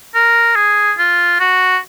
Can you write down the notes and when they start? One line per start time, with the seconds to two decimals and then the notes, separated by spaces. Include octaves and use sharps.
0.15 A#4
0.56 G#4
0.98 F4
1.40 F#4